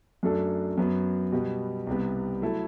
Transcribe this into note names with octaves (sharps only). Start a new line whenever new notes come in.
F#2 F#3 A3 D4 A4
F#2 F#3 B3
B2 G3 B3
C2 C3 G3 B3
F#3 A3 E4 A4